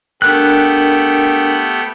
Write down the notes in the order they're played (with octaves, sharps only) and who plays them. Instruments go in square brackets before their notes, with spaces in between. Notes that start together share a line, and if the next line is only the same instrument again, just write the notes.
[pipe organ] A3 B3 G4 [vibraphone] D4 A#4 G5 [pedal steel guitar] F#6